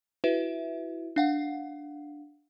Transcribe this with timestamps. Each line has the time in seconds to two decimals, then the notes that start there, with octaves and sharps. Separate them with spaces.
0.24 E4 F#4 B4 E5
1.16 D4 F5 F#5